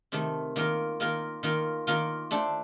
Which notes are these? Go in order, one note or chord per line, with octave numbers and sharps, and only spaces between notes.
C3 D#3 A3
D#3 A#3 F4 A#4
D#3 A#3 F4 A#4
D#3 A#3 F4 A#4
D#3 A#3 F4 A#4
A3 D4 A4 C5